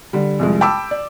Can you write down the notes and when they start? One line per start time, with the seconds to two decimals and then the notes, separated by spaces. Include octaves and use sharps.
0.13 D3 G3
0.39 C2 F2 G#3
0.61 G5 A5 B5 D6 E6
0.91 D5